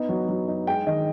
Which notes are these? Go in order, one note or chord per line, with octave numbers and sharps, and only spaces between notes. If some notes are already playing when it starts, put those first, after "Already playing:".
Already playing: B3 D#4
F#3
F#3
D#4
G#3 G5
D#3 D#5